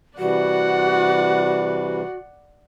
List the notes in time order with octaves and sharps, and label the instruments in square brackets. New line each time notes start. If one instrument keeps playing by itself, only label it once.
[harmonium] C3 E3 G3 [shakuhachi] F#4 [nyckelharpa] D5 F#5